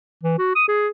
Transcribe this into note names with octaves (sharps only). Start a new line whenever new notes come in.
E3
F#4
D#6
G#4